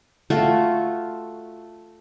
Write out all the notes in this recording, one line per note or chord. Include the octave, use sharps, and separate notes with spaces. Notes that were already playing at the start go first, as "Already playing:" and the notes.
A3 F4 F#4